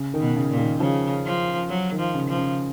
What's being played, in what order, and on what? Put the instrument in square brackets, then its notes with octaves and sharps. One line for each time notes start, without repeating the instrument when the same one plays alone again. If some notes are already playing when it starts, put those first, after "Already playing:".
Already playing: [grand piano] C#3
D#3
[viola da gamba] B2
[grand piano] C#3
[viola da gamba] A#2
[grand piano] D#3
[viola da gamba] C#3 [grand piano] F3
[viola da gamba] F3
F#3
[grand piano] D#3
[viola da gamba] F3
[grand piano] C#3
[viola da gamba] F3
[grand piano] C#3